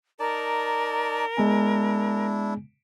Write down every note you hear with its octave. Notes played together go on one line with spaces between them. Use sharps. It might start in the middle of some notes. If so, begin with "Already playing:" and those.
D#4 A#4 D5 A5
G#3 B3 D4 E4 G#5